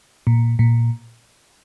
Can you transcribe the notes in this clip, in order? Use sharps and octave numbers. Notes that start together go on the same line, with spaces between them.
A#2
A#2